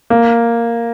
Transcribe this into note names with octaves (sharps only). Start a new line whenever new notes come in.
A#3